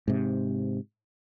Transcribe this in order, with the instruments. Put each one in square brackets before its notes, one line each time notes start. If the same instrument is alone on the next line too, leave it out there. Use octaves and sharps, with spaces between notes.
[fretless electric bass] G#2 C3